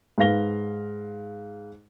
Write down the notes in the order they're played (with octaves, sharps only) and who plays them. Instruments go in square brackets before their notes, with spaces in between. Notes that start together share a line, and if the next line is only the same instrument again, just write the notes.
[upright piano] G#2 B4 F5 A#6 G7